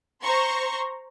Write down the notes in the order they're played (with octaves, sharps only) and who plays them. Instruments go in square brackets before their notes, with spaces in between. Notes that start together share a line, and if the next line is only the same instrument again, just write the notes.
[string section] C5 A#5 C6 C#6